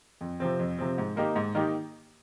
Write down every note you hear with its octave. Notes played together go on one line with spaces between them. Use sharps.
F2
C3 F3 C4
F2
C3 F3 C4
G#2
D#3 A#3 D#4 G4
G#2
D#3 A#3 D#4 G4